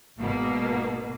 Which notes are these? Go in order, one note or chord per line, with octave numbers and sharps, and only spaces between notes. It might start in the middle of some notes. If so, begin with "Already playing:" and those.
G#1 B2 A#3